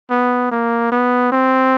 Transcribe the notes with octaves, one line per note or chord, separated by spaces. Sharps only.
B3
A#3
B3
C4